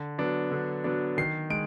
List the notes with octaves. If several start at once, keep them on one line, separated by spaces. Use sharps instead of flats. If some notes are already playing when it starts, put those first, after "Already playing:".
Already playing: D3
F#3 B3 D4
D3
F#3 B3 D4
D#3 C7
G#3 D7